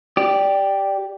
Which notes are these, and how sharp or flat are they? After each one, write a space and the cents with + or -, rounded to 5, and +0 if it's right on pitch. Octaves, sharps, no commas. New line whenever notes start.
G4 +0 D5 +0